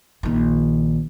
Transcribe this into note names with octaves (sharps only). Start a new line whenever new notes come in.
A#1 D#3